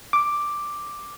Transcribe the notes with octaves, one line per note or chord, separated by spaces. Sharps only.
D6